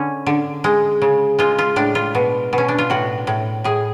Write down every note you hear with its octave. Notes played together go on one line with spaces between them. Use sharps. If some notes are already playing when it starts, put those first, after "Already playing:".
Already playing: D3 C#4
D3
G#3
C#3
G#3 F4
F4
A2 D4
F4
B2
B2
C#4
D4
F4
A2 F#4
A2
A2 G#4